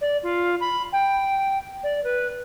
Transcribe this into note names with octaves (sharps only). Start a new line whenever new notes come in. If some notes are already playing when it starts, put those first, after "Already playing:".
D5
F4
B5
G5
D5
B4